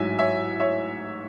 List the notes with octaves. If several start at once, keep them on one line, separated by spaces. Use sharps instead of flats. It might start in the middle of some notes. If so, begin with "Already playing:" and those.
Already playing: A1 G#2 F#3 E5 G#5
C#5 E5
C#5 E5